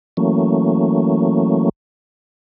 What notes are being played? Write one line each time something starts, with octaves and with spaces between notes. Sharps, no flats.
E3 F#3 A3 A#3 C#4